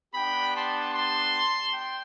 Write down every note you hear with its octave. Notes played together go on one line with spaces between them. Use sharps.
B3 D4 G4 G5 B5
A5 C6
A5 C6
G5